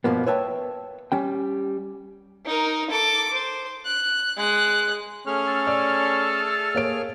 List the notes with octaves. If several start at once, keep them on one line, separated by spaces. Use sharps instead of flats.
G2 B2 F3 A#3 B3
B4 C#5 E5 G5 A5
G3 C#4 G5
D#4 A#4
A4 D6
C5
F#6
G#3 F#6
A3 C#4 G#4 F6
A4
D5
A#3 C#5 D7